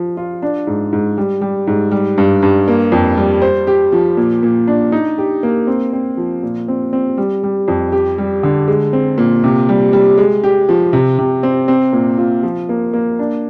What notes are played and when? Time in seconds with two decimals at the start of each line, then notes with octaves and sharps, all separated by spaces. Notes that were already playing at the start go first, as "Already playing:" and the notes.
Already playing: F3
0.17 F4
0.42 D4
0.67 G#2
0.93 G#2
1.18 G3
1.41 G3
1.67 G#2
1.91 G3
2.18 G2
2.43 G2
2.68 A#3
2.92 F2
3.17 G3
3.42 C5
3.67 G4
3.92 F3
4.17 A#2
4.43 A#2
4.67 D4
4.92 D#4
5.18 G4
5.43 A#3
5.67 C4
5.93 C4
6.17 F3
6.43 A#2
6.68 C4
6.93 C4
7.17 G3
7.43 G3
7.68 F2
7.92 G4
8.18 G3
8.43 D3
8.68 G#3
8.93 C4
9.18 A#2
9.44 C3
9.69 G3
9.93 G3
10.18 G#3
10.44 G4
10.69 F3
10.93 C3
11.19 C3
11.43 C4
11.68 C4
11.93 A#2
12.18 F4
12.43 F3
12.69 A#3
12.93 A#3
13.19 D4